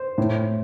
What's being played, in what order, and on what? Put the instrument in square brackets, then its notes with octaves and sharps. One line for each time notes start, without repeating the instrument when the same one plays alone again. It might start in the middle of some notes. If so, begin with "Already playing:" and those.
Already playing: [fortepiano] C5
A2